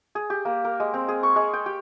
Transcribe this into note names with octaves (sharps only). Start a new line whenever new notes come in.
G#4
G4
A#3
A#4
G#3
C4
G#4
C#6
G#3
G5
G4